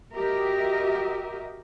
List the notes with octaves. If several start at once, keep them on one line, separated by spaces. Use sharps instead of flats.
F#4 G4 A#4 D#5 E5